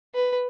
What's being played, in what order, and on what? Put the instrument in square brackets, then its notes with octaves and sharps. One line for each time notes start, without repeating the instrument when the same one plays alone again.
[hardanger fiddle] B4